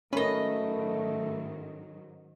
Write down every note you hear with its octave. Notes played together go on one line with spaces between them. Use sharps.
G#2 D#3 F#3 A3 C#4 A#4 B4 D#5